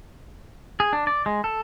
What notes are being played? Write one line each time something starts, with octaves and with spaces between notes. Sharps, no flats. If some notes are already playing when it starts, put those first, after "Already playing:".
G#4
D4
D5
G#3
A4